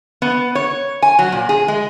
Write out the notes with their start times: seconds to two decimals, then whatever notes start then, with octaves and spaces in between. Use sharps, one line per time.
0.22 B3
0.55 C#5
1.02 G#5
1.19 F#3
1.32 A#2
1.49 G#4
1.68 G#3